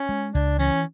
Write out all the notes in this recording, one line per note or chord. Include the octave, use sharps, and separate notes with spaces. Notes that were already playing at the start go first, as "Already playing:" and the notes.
Already playing: C#4
G#3
C#2 D4
E3 C#4